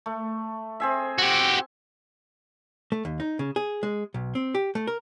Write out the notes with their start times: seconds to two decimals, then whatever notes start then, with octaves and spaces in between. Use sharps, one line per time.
0.06 A3
0.80 C4 G#4 E5
1.18 F#4 G4
2.92 A3
3.05 D#2
3.20 D#4
3.39 C#3
3.56 G#4
3.83 G#3
4.14 B1
4.35 C4
4.55 G4
4.75 A3
4.87 A#4